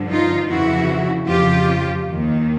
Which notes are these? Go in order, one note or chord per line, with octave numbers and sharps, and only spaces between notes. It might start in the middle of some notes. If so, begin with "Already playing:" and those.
Already playing: G2 D3 F3
D#4 F4
F2 C#3 E3 E4 F#4
F2 C#3 F3 F4 G4
D#2 D#3